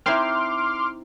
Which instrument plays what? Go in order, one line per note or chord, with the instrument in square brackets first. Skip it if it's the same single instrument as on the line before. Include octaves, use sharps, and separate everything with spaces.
[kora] C4 D#4 E4 [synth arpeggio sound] C6 D6 F6